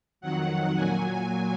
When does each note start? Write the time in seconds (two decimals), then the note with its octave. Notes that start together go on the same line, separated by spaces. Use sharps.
0.21 F2 D#3 F#3 F#5
0.75 A#2 F#3 G#5